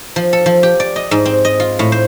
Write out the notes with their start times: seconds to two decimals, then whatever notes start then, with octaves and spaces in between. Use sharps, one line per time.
0.16 F3
0.33 A4
0.46 F3
0.63 G4
0.80 D5
0.96 D#5
1.11 G#2
1.25 C4
1.45 D#5
1.60 F4
1.79 A2
1.92 C5